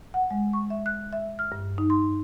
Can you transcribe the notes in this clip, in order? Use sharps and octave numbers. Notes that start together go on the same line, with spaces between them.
F#5
G#3
C#6
E5
F#6
E5
F6
G2
D#4
C6